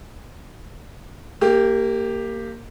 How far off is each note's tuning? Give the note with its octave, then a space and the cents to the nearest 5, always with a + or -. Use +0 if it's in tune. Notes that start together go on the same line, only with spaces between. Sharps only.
A#3 -20 G4 +5